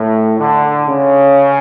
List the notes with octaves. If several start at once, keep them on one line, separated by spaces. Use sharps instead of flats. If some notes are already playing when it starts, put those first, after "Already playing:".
Already playing: A2
D3
C#3